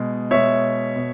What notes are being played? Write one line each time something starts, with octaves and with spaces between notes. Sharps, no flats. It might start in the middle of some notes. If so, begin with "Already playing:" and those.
Already playing: B2 G#3
B2 G#3 C#5 E5
B2